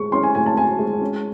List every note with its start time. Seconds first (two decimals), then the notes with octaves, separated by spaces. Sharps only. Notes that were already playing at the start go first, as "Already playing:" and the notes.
Already playing: A2 G#3 C#6
0.12 C#4 C6
0.23 G#5
0.35 A2 G#5
0.46 A5
0.56 A2 G#5
0.79 G#3
1.01 C#4